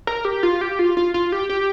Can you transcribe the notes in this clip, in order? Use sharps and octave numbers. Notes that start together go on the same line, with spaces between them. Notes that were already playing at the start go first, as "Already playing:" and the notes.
A#4
G4
F4
G4
F4
F4
F4
G4
G4